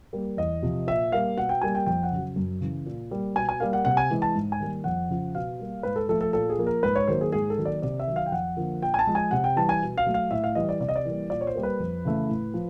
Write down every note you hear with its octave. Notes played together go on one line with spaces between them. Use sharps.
G3 A#3
E2 D#5
C3 F3
A#2 E5
G3 A#3 F5
B2 F#5
G5
G3 A#3 G#5
G5
F2 G5
F#5
C#3 F#3
F#2
C#3 E3
A#2
G3 A#3
B2 G#5
G#5
G3 A#3 F5
F#5
C3 F#5
G#5
E3 G#3
A5
G#2
G#5
D#3 G3 A#3
F2 F#5
C#3 F3
B2 F5
G3 A#3
G#2 B4
A4
F3 A3 A4
A4
A#2 A4
G#4
F3 A#3
A#4
G#2 B4
C#5
D#3 F#3 A#3 C5
G#4
G#2 G#4
A4
D#3 F#3 A#3
D5
C3 D5
E5
D#3 F#3
F5
G5
F2 F#5
D3 F3 A#3
A#2 G5
G#5
A5
F3 G#3
G#5
C3 F#5
G5
E3 G3 A5
G#5
B2
F5
F#3 A3
F5
A2 E5
F5
E3 G3 D#5
D5
C3 D5
D#5
D5
E3 G3 A#3
A#2 D5
C#5
C5
G3 A#3
B4
F2
C#3 E3 A3
A2
F3